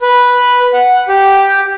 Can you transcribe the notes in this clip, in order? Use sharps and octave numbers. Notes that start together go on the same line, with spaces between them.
B4
F#5
G4